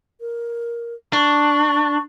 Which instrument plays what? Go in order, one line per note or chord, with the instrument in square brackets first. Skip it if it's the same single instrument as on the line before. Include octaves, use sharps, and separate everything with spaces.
[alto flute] A#4
[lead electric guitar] D4 [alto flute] C#6